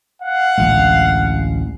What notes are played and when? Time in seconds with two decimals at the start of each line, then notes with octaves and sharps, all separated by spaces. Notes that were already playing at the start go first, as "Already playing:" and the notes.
0.21 F5 F#5
0.58 A1 D2 G#3